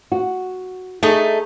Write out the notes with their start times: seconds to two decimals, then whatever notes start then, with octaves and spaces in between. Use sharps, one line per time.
0.12 F#4
1.03 A3 D#4 G#4